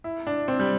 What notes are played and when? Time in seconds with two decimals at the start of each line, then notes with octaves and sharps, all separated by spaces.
0.04 E4
0.27 D4
0.48 C4
0.59 G3